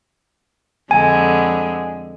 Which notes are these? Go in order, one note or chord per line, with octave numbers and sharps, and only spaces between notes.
F2 D3 G#3 G#5